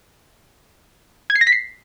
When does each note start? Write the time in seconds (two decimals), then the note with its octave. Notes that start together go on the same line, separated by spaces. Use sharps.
1.30 G#6
1.35 C7
1.41 A#6
1.47 B6
1.52 C7